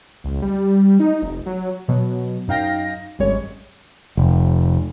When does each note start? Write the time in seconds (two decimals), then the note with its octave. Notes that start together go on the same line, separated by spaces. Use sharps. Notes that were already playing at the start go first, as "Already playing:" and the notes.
0.24 C#2
0.42 G3
1.00 D#4
1.22 F1
1.46 F#3
1.88 B2 F#3
2.48 F#2 D#4 F5 G5 A#6
3.19 G#1 F#2 G3 G#3 C#5
4.17 F1